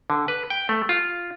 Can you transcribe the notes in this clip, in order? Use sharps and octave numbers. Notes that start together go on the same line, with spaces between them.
D3
B4
G5
A3
F4